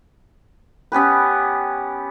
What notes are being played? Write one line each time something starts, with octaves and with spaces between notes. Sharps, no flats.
B3 C#4 G4 B4